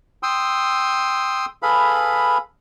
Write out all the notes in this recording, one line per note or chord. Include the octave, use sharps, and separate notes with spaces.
G5 C6 D#6 E6
G#4 A4 B4 F5 B5